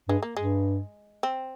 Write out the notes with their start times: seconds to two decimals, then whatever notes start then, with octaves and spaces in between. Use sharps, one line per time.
0.09 G2 G#3
0.23 A#3
0.37 G2 G#3
1.23 C4